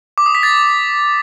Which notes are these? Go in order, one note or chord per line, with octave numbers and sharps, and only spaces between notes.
D6
D#6
B6
A6